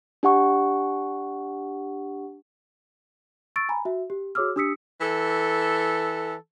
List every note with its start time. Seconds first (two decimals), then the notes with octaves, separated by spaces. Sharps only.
0.23 D4 G4 F#5 C#6
3.56 C#6 E6 A6 D7
3.69 G#5 A#5 B5
3.85 F#4 E5
4.10 G4
4.35 F#4 G#4 C#5 D6 E6 F6
4.56 D4 G4 D#6 E6 B6 C#7
5.01 E3 A4